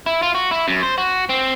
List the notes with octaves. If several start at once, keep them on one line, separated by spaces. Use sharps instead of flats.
E4
F4
F#4
E4
F#2
C5
F#4
C4